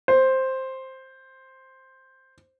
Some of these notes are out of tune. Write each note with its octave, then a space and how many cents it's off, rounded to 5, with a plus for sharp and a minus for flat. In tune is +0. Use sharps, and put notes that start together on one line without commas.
C5 +5